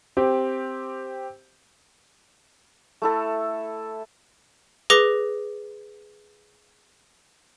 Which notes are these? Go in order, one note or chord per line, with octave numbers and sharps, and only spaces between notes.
C4 G4
A3 E4 A4
G#4 B4 D6 A#6 G7